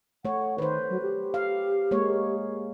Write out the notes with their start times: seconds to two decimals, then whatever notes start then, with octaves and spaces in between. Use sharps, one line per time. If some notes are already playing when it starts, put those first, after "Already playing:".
0.25 A3 C#5 F#5
0.58 D#3 B4 C5
0.89 F#3
1.02 G4
1.34 F5
1.91 G#3 A#3 C#5